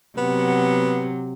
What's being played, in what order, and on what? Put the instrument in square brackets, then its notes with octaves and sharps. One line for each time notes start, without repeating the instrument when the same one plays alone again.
[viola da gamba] C3 F#3 [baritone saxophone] B3